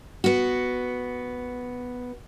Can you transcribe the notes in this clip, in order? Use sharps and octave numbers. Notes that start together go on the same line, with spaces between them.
B3 F#4